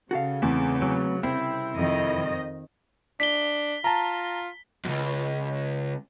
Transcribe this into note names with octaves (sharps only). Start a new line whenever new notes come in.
C#3 F#4 A4 F5
E2 A3 B3 C4
F#3
C2 C4 E4
F2 D#3 D#5
D4 B6 G7
F4 A5 A#5
C#2 F#2